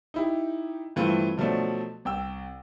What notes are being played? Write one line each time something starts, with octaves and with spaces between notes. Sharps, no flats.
D#4 E4 G4
G2 E3 A3 C4 F4
B2 F3 F#3 A3 D4
C2 G5 E6